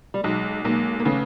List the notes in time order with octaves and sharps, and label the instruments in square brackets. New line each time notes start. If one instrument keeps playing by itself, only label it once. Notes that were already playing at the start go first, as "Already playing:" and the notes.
[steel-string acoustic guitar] G3
[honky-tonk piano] B1 [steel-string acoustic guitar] F#3 G#3
[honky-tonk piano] B1 [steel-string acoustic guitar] G#3 A#3
[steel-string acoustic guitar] A#3
[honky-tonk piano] C#3 [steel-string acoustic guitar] A3 B3